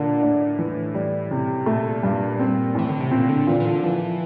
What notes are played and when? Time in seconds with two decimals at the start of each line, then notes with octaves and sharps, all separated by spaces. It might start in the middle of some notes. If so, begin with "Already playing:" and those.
Already playing: A#2 D3 A#3
0.22 A2 D4
0.59 E3
0.95 G3
1.31 C3
1.66 A#2 A3
2.03 G2
2.39 C4
2.75 A2 E3
2.89 D3
3.00 C3
3.11 A#2 C4
3.29 D3
3.47 A#2 E3
3.60 E3
3.65 D3
3.84 E3 F3